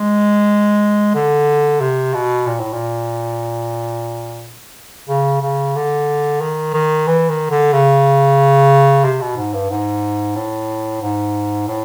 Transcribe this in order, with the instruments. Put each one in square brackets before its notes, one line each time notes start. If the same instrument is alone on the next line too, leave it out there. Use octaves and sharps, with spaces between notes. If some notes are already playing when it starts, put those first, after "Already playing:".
Already playing: [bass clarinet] G#3
D3
C3
B2
A#2
A2
A#2
C#3
C#3
D3
D#3
D#3
E3
D#3
D3
C#3
C3
B2
G#2
G2
G#2
A2
G#2
A2